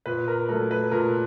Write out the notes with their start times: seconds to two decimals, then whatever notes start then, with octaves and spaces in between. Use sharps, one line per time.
0.06 A#2 B4
0.28 A#4
0.49 F#3 A3 A#4
0.71 B4
0.92 A#2 A#4